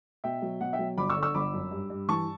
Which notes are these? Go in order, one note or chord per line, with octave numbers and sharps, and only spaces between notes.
B2 E5 G5
F#3
B2 F#5
E5 G5
F#3
G1 B5 D6
C#6 E6
D3
C#6 E6
G1 B5 D6
F#2
G2
G2
E3 A5 C#6